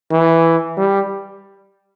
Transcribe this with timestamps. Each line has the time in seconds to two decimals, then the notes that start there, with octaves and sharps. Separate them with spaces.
0.11 E3
0.77 G3